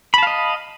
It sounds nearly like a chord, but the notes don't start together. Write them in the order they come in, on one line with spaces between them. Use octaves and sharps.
B5 A5 F5 D#5